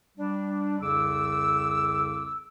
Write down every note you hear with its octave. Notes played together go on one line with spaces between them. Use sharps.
G3 D4
C2 F2 C#3 D6 E6